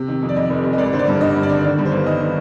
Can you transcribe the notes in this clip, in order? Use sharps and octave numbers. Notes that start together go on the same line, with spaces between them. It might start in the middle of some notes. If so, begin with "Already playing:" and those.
Already playing: C3
D#3
F2
D5
F2 D#5
F1
C3
D#5
G#1 D5
D3 C5
D5
G2
D3 D#5
G2
D5
D3
D#3 D5
G2
C5
G1
D#3 D#5
D#3